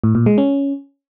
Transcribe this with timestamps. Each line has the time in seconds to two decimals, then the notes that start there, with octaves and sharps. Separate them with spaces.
0.04 A2
0.15 A#2
0.26 G#3
0.38 C#4